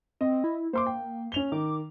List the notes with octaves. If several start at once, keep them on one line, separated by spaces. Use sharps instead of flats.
C4 D#5
E4
A#3 C5 C6 D6
G5
C#4 F7 G7
D#3 D6